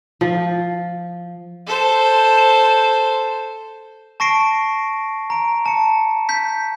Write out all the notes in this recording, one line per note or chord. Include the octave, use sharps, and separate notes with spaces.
F3
A4 C5
A5 C#6 A#6 C7 D7
A#5 D7
A5 C#7
G6 B6